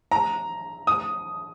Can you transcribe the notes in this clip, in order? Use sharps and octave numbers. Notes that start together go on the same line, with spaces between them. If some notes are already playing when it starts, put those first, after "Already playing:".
A#5
D#6